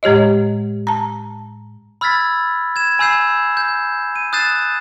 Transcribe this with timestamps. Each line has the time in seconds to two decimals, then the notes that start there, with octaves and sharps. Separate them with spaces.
0.03 A2 G#3 G4 C#5 D#5
0.87 A5 A#5
2.01 B5 E6 F6 G#6 A6 B6
2.76 G#6 E7
2.99 G#5 B5 E6 G6 C7 E7
3.57 G6
4.16 D#7
4.33 D#6 F#6 G6 A6 C7 E7